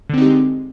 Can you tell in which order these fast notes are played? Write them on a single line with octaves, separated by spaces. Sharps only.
D3 C4 D#4 G4 G#3